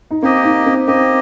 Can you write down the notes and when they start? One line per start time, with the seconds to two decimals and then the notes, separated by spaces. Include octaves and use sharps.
0.11 D#4
0.22 A#3 C4 G4 D#5
0.44 D#4
0.66 C4
0.87 A#3 C4 G4 D#5